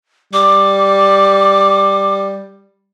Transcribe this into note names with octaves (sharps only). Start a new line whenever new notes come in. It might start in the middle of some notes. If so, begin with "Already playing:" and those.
G3 D6